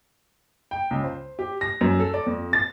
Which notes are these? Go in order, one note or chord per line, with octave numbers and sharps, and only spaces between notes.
G5
C#2
C5
G4
A#6
F#2
A4
D5
F2
A6